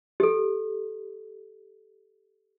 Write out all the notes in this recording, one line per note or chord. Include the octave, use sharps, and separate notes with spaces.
G4 A4